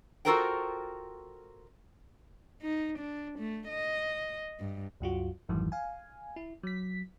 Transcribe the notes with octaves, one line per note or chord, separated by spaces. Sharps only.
F4 F#4 A4 A#4 C5 G5
D#4
D4
A3
D#5
G2
C2 F#2 F4 F#4
G#1 F2 G#2 D#3 E3 F#3
F5 G#5
E4
F#3 B6